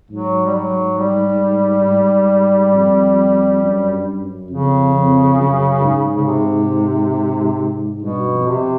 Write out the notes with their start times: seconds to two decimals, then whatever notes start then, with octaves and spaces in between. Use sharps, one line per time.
0.11 G#2 F#3
0.46 G3
0.55 F#3
0.98 G3
1.86 G#2
2.75 F2
3.63 F#2
3.92 G2
4.21 F#2
4.51 F2 C#3
4.95 F2
5.38 F#2
5.83 G#2
6.16 C#3
6.26 C3
8.02 G2 B2
8.32 F2
8.47 C3